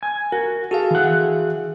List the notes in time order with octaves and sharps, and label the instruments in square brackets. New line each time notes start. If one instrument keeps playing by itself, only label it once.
[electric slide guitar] G#5
[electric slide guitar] F#4 [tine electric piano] A#4
[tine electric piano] F#4 G#4 F5 [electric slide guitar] A4
[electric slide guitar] E3 F#5